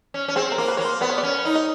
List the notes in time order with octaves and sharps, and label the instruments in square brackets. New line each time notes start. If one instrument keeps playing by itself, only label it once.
[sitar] C#4
C#4
[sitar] C4 [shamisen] G#4
[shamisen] A#4
[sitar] A#3
[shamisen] B4
[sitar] A#3 [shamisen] C#5
[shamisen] C5
[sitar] B3 [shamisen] D5
[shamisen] C#5
D5
[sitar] C#4
D#4
[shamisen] D#5